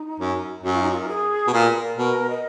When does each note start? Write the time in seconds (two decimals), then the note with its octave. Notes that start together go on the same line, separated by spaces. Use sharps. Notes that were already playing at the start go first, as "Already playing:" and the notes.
Already playing: D#4
0.20 F#2
0.63 F#2 F#4
0.73 F4
0.82 D#4
0.91 F4
1.00 A#4
1.08 G#4
1.48 B2
1.53 A#2 A#4
1.98 B2 A#4
2.30 D#5